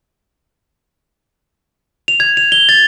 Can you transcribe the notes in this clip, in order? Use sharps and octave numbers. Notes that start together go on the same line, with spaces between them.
F7
G#6
F7
G7
A6